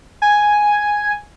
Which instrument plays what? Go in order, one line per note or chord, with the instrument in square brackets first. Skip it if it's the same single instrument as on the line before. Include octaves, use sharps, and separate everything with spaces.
[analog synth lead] G#5